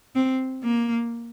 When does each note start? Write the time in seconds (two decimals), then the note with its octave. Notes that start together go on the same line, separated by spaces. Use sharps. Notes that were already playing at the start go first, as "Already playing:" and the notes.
0.15 C4
0.63 A#3